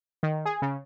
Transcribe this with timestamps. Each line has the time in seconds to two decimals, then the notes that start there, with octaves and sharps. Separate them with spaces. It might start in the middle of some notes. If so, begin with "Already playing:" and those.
0.23 D#3
0.46 G#4
0.62 C#3